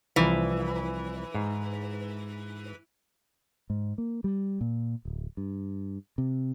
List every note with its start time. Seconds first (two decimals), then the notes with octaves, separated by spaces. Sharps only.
0.16 C2 E3 F3
1.35 G#2
3.70 G#2
3.98 A#3
4.24 G3
4.61 A#2
5.05 D1
5.37 G2
6.18 C3